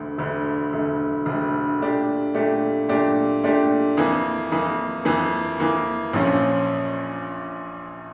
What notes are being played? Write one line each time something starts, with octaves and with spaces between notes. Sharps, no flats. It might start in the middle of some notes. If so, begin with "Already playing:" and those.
Already playing: E1 D2 D3 A3
E1 D2 D3 A3
E1 D2 D3 A3
E1 D2 D3 A3
A#2 A3 D4 G4
A#2 A3 D4 G4
A#2 A3 D4 G4
A#2 A3 D4 G4
F2 E3 A#3
F2 E3 A#3
F2 E3 A#3
F2 E3 A#3
A#1 A#2 F3 C#4 F4